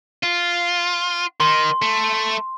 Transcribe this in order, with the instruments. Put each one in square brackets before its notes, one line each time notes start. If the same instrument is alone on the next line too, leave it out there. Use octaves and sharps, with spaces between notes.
[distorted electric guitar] F4
[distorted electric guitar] D#3 [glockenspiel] C6
[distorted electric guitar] A3